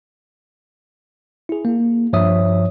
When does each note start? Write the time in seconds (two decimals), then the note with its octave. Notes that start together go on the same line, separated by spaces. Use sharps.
1.49 E4 G#4
1.65 A#3
2.13 G2 F3 C#5 E5 D#6